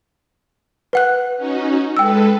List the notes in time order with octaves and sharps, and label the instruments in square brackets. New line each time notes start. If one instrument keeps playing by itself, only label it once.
[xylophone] B4 F#5 F#6
[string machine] C#4 D#4 F#4
[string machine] G#3 A4 B4 [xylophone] G5 E6